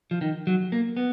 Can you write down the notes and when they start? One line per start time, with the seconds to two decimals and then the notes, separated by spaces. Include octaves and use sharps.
0.11 F3
0.21 D#3
0.47 F#3
0.72 A#3
0.97 B3